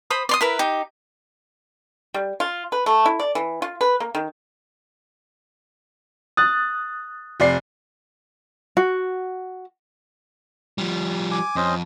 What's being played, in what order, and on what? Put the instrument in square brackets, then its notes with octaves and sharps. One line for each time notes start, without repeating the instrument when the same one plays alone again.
[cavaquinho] C5 B5 D#6
D5 C6 D#6
E4 A#4 B4
D#4 G4
[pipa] G3
F4
B4
A3
E4
D5
E3
F4
B4
A#3
D#3
[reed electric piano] D#6 F#6 [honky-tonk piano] A6
[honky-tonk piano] F1 D5 C7
[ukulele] F#4
[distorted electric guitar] F3 G3
[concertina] G#5 D6
[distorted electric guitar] F2 [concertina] C#4 C5 D#5